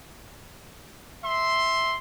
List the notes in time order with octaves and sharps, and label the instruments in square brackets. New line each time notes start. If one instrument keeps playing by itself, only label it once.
[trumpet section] E5 C6